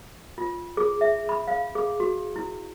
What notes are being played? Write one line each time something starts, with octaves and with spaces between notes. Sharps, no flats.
F4
G#4
E5
B5
F5
G#4
F#4
E4